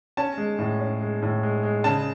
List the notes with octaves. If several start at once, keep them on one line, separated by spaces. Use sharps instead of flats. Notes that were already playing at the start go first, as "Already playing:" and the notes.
C#4 A5
G#3
A2
C#4
G#3
A2
G#3
G#3
C#3 A5